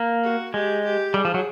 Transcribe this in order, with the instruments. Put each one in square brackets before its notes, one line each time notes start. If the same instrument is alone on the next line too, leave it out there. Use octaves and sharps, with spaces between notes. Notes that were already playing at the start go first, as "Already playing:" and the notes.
Already playing: [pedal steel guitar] A#3
[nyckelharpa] F#4
[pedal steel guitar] G#3 [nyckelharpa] G4
[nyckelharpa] G4
[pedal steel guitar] G3 [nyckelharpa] G#4
[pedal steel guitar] F3
F#3